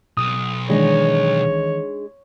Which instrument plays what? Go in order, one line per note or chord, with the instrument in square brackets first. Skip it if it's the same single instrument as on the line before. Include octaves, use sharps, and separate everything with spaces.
[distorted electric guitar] B1 [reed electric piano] D#6
[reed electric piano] D#3 E3 [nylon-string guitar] G#3 D4 D#4 [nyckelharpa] C#5